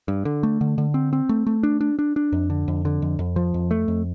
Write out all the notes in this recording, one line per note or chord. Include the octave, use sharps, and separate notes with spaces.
G2
D3
A3
D3
D3
C4
C4
A3
A3
D4
D4
D4
D4
F2
D3
F2
D3
F2
F2
F3
F2
A3
F2